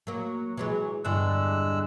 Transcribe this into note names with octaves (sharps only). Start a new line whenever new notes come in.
F#3 A#3
E3 F#3 G#3
E2 G2 D3 G#3 E6 F#6